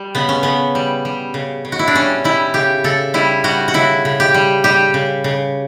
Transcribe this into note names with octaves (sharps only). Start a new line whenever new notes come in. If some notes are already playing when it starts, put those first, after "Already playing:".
Already playing: G3
C#3 B3
C#4
C#3 B3
G3
G3
C#3
C#3
F#4
E4
D4
G3 C#4
G3 E4
C#3 G4
C#3 A4
G3 E4
G3 F#4
F#4
C#3 E4
C#3
G4
G3
G3 G4
C#3
C#3